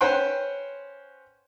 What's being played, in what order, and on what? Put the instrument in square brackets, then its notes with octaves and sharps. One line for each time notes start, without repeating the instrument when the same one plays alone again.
[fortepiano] C#4 B4 C5 F#5 G5 C6